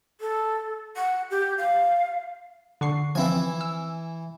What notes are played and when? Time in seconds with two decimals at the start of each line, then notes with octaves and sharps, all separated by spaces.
0.21 A4
0.97 F#5
1.31 G4
1.58 F5
2.81 D3 C#6 C7
3.15 E3 F3 C4 E4 G#5
3.61 E6